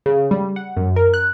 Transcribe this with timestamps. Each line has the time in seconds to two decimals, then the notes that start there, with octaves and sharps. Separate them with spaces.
0.06 C#3
0.31 G3
0.56 F#5
0.76 F#2
0.96 A#4
1.14 F#6